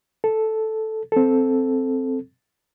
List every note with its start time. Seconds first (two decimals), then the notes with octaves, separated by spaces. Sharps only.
0.24 A4
1.12 C4 A4